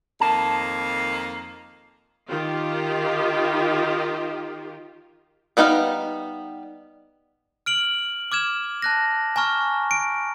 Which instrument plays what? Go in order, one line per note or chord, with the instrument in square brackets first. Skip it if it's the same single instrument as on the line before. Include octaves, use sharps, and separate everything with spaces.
[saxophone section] F2 D#3 A#3 [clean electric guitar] A5
[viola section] D#3 F4 G4
[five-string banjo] G3 B3 D#4 B4 F5
[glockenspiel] F6 D7 F#7
D6 F6 G#6 E7
A5 F#6 A#6
G#5 A#5 C#6 F6
D7